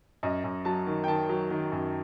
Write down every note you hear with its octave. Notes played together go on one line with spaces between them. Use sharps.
F#2 D#5
F#2
F#3 A5
D#3
G5
D#3 A5
F#3
D#3
F#2